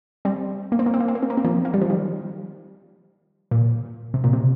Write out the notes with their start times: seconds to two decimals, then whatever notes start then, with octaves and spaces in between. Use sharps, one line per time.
0.25 G3 C4
0.72 A#3
0.79 C4
0.86 A#3
0.94 C4
1.00 A#3
1.08 C4
1.15 A#3
1.23 C4
1.30 A#3
1.37 C4
1.45 F3 A#3
1.65 A#3
1.74 G3
1.82 F3
1.90 D#3 G3
3.51 A#2
4.14 C3
4.24 A#2
4.33 C3